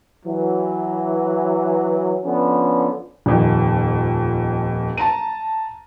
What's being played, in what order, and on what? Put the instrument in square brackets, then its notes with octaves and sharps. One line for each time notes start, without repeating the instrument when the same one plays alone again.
[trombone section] E3 F#3
D3 F3 B3 C#4
[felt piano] D#1 F2 D#3
A5 A#5 D#7